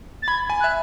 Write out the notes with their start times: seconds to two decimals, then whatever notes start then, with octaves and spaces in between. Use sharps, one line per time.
0.22 A6
0.28 B5 G#6
0.50 G#5
0.60 E5 F#6